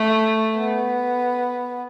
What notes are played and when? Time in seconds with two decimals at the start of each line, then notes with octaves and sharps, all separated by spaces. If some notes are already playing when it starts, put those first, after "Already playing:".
Already playing: A3
0.57 B3